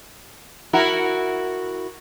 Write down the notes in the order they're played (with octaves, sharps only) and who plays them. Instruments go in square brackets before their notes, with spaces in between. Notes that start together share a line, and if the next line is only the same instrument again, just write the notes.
[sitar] E4 F#4 A#4